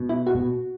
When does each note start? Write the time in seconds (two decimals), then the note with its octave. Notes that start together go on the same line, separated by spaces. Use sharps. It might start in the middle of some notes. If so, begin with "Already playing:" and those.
Already playing: B2
0.09 E4
0.27 F#4
0.35 B2